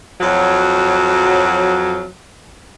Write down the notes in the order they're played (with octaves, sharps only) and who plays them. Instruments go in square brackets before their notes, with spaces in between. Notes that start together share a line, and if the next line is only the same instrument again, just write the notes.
[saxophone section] F2 F#3